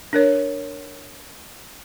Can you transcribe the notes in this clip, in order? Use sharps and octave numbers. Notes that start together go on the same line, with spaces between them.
D4 A#4 C#5